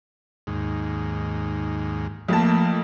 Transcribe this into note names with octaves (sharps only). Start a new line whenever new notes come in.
D#2 G#2
F2 F3 A3 A#3 A5